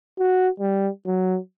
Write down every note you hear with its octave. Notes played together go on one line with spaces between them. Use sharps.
F#4
G3
F#3